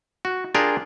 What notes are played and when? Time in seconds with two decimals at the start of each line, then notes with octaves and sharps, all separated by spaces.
0.25 F#4
0.55 D4 F4 G4 G#4 A#4